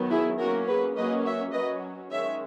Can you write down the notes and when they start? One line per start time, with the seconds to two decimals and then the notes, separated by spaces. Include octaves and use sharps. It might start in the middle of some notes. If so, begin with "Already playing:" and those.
Already playing: D#3 F#3 B3
0.10 E4 G#4
0.39 F#3 A#3 C#4 F#4 A#4
0.68 G#4 B4
0.96 F#3 A#3 C#4 B4 D#5
1.25 C#5 E5
1.53 F#3 C#4 B4 D#5
2.11 D#3 G#3 C#4 C#5 E5